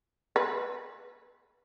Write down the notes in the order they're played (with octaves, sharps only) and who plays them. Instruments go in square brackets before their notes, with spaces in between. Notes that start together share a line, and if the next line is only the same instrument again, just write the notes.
[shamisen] B4